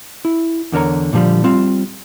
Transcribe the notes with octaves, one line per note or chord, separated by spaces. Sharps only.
E4
E2 D3 A#4 C#5 A#5
A#2 D3 F3 G3
G3 C4 F4